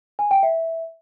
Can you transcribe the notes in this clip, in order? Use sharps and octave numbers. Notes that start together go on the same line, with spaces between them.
G#5
G5
E5